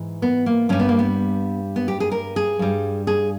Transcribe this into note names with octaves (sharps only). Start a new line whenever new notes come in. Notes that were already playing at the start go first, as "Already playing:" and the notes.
Already playing: G#2 E3
B3
A#3
G2 G3 C#4
B3
A#3
B3
B3
G4
G#4
A#4
G#4
G2 G3
G#4